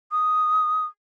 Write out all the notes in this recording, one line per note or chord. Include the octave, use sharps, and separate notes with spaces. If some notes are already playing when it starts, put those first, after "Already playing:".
D#6